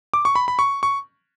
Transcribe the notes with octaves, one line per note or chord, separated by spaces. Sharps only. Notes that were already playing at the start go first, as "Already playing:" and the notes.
D6
C#6
B5
B5
C#6
C#6